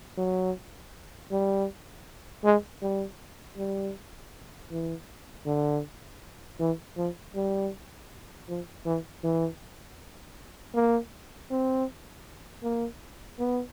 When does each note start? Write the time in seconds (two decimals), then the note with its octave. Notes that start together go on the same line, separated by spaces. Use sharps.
0.17 F#3
1.31 G3
2.44 G#3
2.82 G3
3.57 G3
4.71 E3
5.46 D3
6.60 E3
6.97 F3
7.35 G3
8.49 F3
8.86 E3
9.24 E3
10.75 A#3
11.51 C4
12.63 A#3
13.39 B3